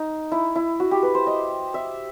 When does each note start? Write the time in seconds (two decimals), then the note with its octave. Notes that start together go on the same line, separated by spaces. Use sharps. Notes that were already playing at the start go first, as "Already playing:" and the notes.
Already playing: D#4
0.32 E4
0.55 E4
0.80 F#4
0.91 G4
1.03 B4
1.15 C5
1.27 D#5
1.74 E5